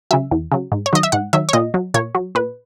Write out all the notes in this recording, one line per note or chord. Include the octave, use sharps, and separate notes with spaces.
C#3 F#3 E5
E2
C#3 F#3
G#2
C#5
D#3 F#3 D#5
E5
G#2 F#5
D#3 F#3 E5
C#5
A#2 D#5
F#3
A#2 C#5
F#3
A#2 B4